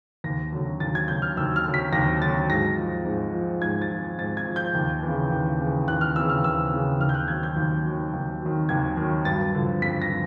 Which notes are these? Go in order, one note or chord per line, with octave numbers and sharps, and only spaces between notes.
D#2 A#6
D3 F#3
D#2 A6
G#6
D3 F#3 G6
F6
D#2 E6
F6
D3 F#3
B6
D#2 A#6
D3 F#3 A6
G#2 A#6
F3
G#2
F3
G#2 G#6
A6
F3
G#2 A6
G#6
F3
G6
D#2
C#3 E3
D#2
C#3 E3
D#2 F#6
F6
C#3 E3 E6
F6
D#2 E6
C#3 E3
D#2 F6
G6
F#6
D#3 F#3 G#6
G6
D#2
D#3 F#3
D#2
D#3 F#3
D#2 G#6
D#3 F#3
G2 A6
D3 F3
G2 B6
A#6
F3